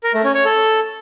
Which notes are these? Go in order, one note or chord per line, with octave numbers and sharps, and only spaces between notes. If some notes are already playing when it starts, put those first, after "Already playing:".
A#4
A3
C#4
C#5
A4